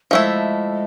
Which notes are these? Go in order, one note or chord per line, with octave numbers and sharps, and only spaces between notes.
F3 G#3 A3 E4